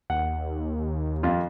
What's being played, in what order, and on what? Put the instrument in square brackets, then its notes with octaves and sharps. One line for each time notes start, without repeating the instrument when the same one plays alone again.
[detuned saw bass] D#2 [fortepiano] F#5
[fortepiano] F2 F4